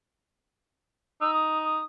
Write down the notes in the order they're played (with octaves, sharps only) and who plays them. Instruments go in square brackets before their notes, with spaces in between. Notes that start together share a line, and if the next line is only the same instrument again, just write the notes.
[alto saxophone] D#4 [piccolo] E6
[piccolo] D#6
D#6